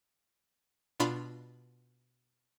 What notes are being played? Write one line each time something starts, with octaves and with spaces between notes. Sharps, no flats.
B2 D4 F4 B5